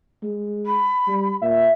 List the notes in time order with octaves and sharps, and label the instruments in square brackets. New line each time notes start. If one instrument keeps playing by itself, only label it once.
[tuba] G#3
[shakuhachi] B5
[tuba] G3
[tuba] A#2 [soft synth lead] E5